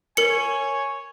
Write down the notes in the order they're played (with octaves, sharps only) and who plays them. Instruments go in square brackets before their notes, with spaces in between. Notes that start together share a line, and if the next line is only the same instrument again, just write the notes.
[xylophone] A#4 C#7 [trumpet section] C#5 G#5